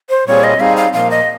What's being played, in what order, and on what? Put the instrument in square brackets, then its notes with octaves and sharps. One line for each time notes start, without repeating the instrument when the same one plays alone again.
[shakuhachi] C5
[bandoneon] A#2 G3 C4 F4 G#4 [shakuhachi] C#5
[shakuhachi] D#5
[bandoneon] G3 C4 D#4 G#4 [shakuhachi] F5
[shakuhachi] F5
[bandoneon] A#2 F3 A#3 [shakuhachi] F5
[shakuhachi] D#5